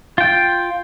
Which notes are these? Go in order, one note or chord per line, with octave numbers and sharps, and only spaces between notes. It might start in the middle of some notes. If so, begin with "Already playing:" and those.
F4 G5